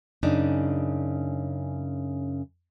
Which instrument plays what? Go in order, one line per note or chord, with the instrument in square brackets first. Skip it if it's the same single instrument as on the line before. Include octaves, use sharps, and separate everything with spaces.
[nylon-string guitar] F#2 C#3 D4 D#4